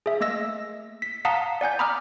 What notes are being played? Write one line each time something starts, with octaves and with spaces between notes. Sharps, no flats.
G#4 E5
A3 A#3 D#5 E6 A#6
B6
F5 F#5 A5 A#5 D#6 B6
D5 F#5 G#5 G6
A#5 B5 D6 D#6 F6